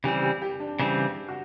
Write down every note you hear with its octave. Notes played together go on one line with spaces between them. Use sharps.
C#3 E3 G3 C4 G4
G4
G4
D4
C#3 E3 G3 C4
F#4